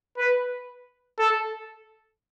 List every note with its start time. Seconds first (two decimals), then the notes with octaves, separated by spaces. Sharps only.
0.17 B4
1.18 A4